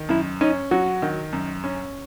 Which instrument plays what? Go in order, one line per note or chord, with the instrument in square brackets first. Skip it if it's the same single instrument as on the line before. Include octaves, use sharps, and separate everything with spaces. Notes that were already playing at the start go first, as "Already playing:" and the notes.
Already playing: [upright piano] D#3
[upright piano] F#2 [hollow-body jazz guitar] E4
[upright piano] C#4 [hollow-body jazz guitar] D#4
[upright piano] F#3 [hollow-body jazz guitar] F#4
[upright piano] D#3
F#2
C#4